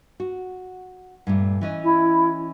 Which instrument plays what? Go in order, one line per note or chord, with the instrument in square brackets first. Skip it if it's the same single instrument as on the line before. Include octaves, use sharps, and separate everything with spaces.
[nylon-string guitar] F#4
G2 A#2 A3
E3 C#4 D#5
[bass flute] E4